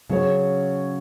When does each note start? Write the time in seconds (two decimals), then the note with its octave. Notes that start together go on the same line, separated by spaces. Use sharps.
0.10 C#3 F#3 C#4 G#4 C#5